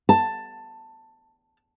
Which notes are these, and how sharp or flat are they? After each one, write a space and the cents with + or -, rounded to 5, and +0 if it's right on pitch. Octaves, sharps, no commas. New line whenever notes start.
A5 +10